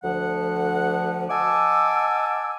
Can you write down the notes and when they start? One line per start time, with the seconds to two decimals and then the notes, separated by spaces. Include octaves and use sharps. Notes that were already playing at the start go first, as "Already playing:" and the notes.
0.04 D2 F3 F#5
1.30 D#5 F#5 G#5 A5 D6 E6